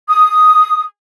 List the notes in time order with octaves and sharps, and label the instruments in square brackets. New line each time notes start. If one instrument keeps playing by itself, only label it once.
[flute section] D#6